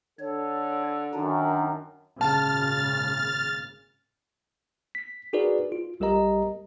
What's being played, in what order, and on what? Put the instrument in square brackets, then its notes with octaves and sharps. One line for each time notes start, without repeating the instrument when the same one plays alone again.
[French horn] D3 [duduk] A4 [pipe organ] C#5
[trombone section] F#2 [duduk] D#3 [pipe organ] D4 D#4
[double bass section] G#1 A#2 C#3 [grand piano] A5 [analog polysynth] F6 A6
[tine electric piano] B6
D#4 F#4 G#4 A#4 B4 D5
F4
B1 G3 G4 A#4 D#5 A#5